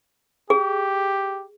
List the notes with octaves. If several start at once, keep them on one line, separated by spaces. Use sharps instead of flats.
G4 G#4